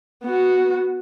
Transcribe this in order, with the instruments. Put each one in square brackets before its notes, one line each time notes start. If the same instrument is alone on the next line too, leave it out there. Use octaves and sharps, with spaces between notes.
[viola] B3 F#4